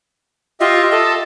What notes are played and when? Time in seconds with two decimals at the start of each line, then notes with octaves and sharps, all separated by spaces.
0.60 F4 G4 D#5 E5
0.91 A4 D#5